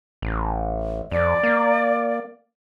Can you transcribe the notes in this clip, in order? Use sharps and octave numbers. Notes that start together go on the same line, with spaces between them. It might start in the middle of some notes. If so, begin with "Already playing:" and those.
A1
F2 D5
A#3